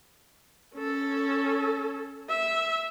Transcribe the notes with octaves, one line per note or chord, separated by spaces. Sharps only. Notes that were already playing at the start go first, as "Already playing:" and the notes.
C#4 A4
E5